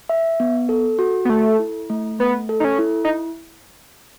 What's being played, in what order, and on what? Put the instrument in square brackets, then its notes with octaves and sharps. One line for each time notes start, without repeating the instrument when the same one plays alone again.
[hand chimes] E5
B3
A4
F#4
[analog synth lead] B3
[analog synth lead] A3 [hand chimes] A4
[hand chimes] E4
A3
[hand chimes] A3 [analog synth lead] B3
[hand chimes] A4
[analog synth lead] D#4
C#4
[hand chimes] E4
[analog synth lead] D#4